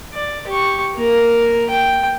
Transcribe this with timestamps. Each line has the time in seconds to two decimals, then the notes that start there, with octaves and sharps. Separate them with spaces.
0.13 D5
0.47 G4 C#6
0.94 A#3 A#4
1.70 G5